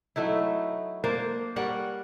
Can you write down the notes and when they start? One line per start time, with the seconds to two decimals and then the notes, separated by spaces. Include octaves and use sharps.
0.16 F#3 A3 D#4 E4
1.04 A#3 D4 A#4 C5
1.56 G3 A#4 C#5 F#5